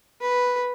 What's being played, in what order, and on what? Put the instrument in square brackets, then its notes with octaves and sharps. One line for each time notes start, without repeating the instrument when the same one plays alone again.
[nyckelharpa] B4